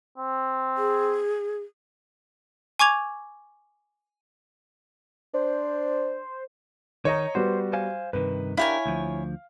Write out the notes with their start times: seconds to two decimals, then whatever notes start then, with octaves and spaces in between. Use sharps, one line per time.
0.18 C4
0.78 G#4
2.79 G#5 C#6 D6 G#6 F7
5.34 D4 C5
7.05 D#3 D#4 C#5 D#5 A#5
7.35 G3 B3 F#4 C5
7.73 C5 F5 G#5
8.13 G2 C3 D#3 B4
8.57 D4 E4 G4 A#4 C#5 F5 G#5
8.86 D2 F3